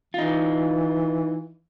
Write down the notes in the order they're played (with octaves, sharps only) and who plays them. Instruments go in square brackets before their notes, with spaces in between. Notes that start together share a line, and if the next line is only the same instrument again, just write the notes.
[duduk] E3 [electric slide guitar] D#4 F4